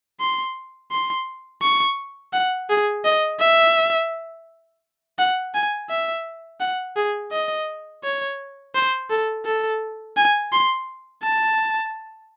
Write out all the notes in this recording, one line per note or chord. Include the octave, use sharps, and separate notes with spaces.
C6
C6
C#6
F#5
G#4
D#5
E5
F#5
G#5
E5
F#5
G#4
D#5
C#5
C5
A4
A4
G#5
C6
A5